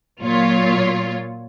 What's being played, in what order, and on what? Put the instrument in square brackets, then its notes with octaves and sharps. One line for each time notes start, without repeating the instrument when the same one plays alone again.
[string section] A#2 F#3 F4 C#5